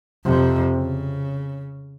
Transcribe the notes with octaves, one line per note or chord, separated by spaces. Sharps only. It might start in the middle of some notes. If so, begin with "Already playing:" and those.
F2 C3
C#3